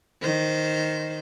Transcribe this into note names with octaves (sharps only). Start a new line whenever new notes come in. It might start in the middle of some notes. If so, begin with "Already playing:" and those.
D#3 C5